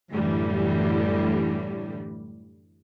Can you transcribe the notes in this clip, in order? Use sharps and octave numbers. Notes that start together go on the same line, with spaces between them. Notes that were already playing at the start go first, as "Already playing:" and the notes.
F#2 A2 D3 E3 G3